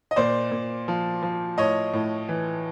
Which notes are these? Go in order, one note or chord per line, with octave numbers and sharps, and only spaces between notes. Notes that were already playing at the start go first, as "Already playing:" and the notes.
D#5
A#2 C5 D5
A#2
F3
F3
A2 C#5 D#5
A2
E3